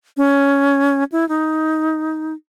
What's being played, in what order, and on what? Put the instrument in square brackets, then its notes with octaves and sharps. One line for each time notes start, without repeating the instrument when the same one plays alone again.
[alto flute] C#4
E4
D#4